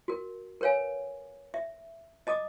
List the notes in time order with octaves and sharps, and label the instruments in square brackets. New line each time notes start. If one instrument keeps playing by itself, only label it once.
[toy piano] F#4 A#4
A#4 B4 C#5 F5 G#5
E5
D#5 A5 D6 D#6